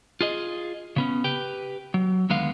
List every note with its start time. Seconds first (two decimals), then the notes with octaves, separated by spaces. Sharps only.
0.21 F4 G#4 D#5
0.96 C#3 B3 C#4
1.24 G4 B4 G5
1.94 F#3
2.30 D#2 D3 G#3 B3 F5